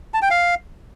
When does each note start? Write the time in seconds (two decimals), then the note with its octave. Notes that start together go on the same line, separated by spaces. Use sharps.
0.14 A5
0.22 G5
0.30 F5